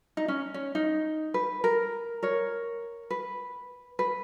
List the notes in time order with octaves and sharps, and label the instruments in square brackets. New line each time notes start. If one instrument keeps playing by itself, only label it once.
[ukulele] D#4
C#4
C#4
D#4
B4
A#4
A#4 C#5
B4
B4